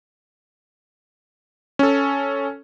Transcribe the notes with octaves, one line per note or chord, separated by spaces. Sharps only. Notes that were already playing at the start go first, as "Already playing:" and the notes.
C#4 A4